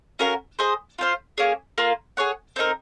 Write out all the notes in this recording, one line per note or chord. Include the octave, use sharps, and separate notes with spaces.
C#4 F#4 A#4 F5
G#4 C5 D#5
F4 C5 F5
A#3 C#4 G#4 C#5
A#3 F4 A#4
G#4 C#5 F#5
C4 D#4 A#4